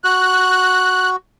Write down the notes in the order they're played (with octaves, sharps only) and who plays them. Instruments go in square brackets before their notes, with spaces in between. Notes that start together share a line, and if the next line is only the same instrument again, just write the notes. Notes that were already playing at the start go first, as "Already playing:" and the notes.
[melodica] F#4 [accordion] F#6